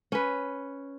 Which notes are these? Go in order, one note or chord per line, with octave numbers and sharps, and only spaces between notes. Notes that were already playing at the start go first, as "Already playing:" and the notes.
C#4 B4